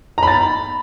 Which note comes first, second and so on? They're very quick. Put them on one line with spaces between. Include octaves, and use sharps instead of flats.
A#5 B5 A6